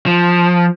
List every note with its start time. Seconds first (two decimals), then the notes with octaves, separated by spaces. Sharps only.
0.07 F3